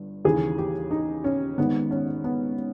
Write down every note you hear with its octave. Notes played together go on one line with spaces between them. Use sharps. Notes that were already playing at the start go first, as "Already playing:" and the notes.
Already playing: G1 G2
D#2 C#3 E3 G#4
G4
D#4
C#4
G#1 G#2 D#3 B3
C#4
B3